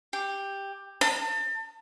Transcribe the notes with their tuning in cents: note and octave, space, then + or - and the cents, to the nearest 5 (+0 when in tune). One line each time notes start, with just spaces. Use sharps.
G4 +10
A5 +35